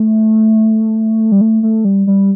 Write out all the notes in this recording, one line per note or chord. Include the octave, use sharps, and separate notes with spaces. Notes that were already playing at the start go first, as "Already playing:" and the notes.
Already playing: A3
G3
A3
A3
G3
G3